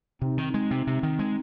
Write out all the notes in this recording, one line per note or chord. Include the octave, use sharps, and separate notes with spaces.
C3 C4 D#4
D#3
G#3
C3
C3
D#3
G#3